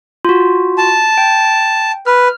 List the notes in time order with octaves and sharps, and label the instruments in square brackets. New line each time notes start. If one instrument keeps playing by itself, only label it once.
[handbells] F4 F#4
[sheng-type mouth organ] A5
[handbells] G5
[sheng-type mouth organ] B4 [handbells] F6